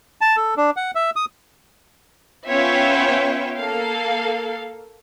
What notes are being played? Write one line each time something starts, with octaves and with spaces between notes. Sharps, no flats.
A5
A4
D4
F#5
E5
D#6
B3 C#4 F4 C#5 E5 G5
A#3 A4 F5